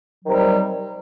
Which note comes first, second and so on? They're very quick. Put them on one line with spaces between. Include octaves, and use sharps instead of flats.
F#3 D#3 C3 G3